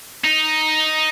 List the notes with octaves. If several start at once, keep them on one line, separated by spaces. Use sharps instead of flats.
D#4